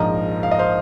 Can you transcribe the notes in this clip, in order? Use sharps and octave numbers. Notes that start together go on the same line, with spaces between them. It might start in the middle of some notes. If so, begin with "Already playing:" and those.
Already playing: A#1 G#2 F3 A#4 D#5
F5
D#5
C5 F5